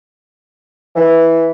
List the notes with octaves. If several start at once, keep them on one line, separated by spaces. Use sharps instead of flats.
E3